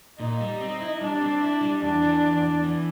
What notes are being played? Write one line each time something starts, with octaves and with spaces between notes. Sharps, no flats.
A#2 D#4
G3
C4
E4
G3 D4
C4
E4
G3
E2 D4
E3
E2
E3
E3